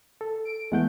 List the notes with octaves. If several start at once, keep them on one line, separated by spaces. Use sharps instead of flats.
A4
D7
E2 G#3 A3 F#5 G6